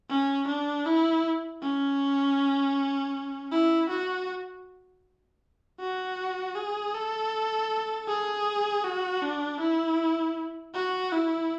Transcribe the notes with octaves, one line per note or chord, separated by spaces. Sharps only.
C#4
D4
E4
C#4
E4
F#4
F#4
G#4
A4
G#4
F#4
D4
E4
F#4
E4